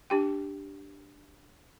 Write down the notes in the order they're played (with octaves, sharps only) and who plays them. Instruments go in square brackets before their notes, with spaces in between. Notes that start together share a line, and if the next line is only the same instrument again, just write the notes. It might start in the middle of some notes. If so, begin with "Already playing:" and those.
[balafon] D4 G4 G5